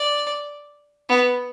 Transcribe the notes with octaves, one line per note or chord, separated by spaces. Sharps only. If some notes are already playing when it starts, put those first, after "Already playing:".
Already playing: D5
B3